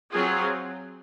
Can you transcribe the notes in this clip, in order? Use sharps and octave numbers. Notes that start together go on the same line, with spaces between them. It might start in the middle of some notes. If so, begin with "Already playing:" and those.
F#3 C4 F4 G#4